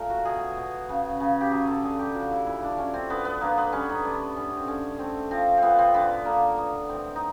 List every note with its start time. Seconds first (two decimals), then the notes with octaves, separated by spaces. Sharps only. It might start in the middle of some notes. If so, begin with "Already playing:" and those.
Already playing: A#2 A3 A#4
0.10 F#4
0.25 B2 G#4
0.57 B2
0.89 C#3
1.20 C#3
1.41 G4
1.51 F#3 G#4
1.67 A4
1.83 D3 G#4
1.99 G4
2.15 F3 F#4
2.31 E4
2.46 A#2 E4
2.63 D4
2.78 D3 C#4
2.94 C4
3.10 D3 B3
3.25 B3
3.41 D3 A#3
3.58 B3
3.73 G3 C#4
3.89 D#4
4.04 A3 D4
4.36 D3 C#4
4.57 C4
4.68 D3 C#4
4.99 A3 C4
5.31 F3 C4
5.58 A#2 B3 C4
5.79 C4
5.94 D3 B3
6.25 D3 A#3
6.57 A2 B3
6.89 A2 C4
7.16 D#4